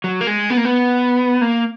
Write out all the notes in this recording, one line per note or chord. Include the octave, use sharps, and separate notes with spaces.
F#3
A#3
G#3
B3
A#3
B3
A#3